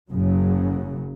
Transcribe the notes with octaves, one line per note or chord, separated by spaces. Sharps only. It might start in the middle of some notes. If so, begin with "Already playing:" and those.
F#1 F#2 C#3 F#3